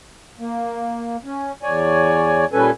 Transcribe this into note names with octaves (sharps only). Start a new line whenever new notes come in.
A#3
C#4
E2 C#5 D5 G#5
A#2 G3 C#4 A4 B4 G#5